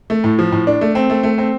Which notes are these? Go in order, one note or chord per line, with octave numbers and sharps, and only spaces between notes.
A3
A2
F3
A2
D4
A3
C4
A3
A3
C4